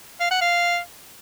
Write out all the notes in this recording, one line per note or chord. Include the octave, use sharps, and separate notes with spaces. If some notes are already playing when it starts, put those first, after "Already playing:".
F5
F#5
F5